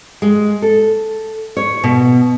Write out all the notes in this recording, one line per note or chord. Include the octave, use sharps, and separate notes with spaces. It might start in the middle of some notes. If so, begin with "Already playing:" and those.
G#3
A4
C#5
B2